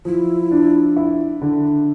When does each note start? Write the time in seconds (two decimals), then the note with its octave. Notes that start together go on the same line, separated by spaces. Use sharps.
0.05 F3 E4
0.52 D4
0.97 E4
1.41 D3